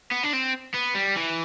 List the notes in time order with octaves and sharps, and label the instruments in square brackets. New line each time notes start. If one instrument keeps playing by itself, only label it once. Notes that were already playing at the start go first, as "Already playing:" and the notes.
[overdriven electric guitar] B3
D4
C4
B3
G3
E3